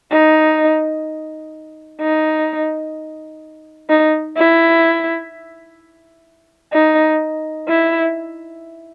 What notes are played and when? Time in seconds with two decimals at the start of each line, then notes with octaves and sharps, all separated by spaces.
0.11 D#4
2.01 D#4
3.90 D#4
4.37 E4
6.73 D#4
7.68 E4